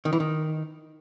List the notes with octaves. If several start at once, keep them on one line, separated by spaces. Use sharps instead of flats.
D#3
E3
D#3